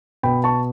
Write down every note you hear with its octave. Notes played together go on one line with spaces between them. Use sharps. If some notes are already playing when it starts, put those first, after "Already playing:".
B2 G5 B5
A5 C#6